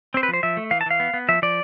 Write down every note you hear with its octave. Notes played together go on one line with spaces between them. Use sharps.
C4 C5
B4
F3
C5
F3 E5
A3
E3 F5
A5
E3 F5
B3
B3
F3 E5
F3 D5